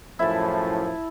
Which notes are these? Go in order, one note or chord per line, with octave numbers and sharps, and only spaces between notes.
F#2 A2 F3 E4 A5